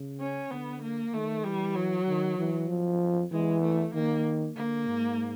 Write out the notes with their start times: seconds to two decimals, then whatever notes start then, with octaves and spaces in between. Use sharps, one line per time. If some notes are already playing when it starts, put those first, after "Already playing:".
Already playing: C#3
0.20 C#4
0.51 D3 B3
0.82 A#3
1.13 D#3 A3
1.44 E3 G3
1.75 F#3
2.07 D#3
2.38 E3
2.69 F3
3.32 E3 G#3
3.63 A3
3.94 D#3 A#3
4.56 D3 A#3
4.87 G#2